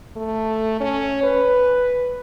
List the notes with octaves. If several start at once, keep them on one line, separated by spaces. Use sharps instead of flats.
A3
C#4
B4